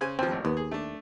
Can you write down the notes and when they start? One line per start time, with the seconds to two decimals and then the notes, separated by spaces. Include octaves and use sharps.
0.01 C#3 C5 G#5
0.19 D#2 F3 C4
0.31 G#1 A2
0.45 D#2 B3
0.57 G#4
0.71 A3 D4